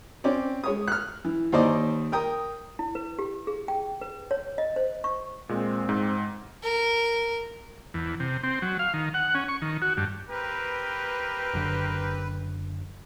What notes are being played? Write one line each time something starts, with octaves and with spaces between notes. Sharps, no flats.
C4 C#4 D5
G#3 C#5 D#6
F6 F#6
E3
D#2 D#4 C5 D5 D#5
A#4 G5 D#6
E4
B4
G4
G#4
G5
B4
C#5
D#5
C5
C#6
A#2 G#3 C4
G#2
A#4
E2
C3
C4
F#3
F5
D#3
F#5
C#4
C#6
D#3
F#4
G2
C4 G4 A#4 B4
F#1 F#2 D3